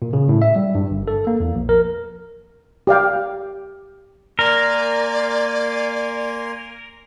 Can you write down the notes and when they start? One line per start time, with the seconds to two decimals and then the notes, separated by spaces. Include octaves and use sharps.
0.02 A#2
0.13 C#3
0.29 A2
0.42 E5
0.56 G3
0.75 G2
0.91 G1
1.08 A4
1.27 A#3
1.40 E2
1.55 A#1
1.69 A#4
2.87 G4 D5 F5 G5
4.39 A#3 A#4 D5 G#5 C6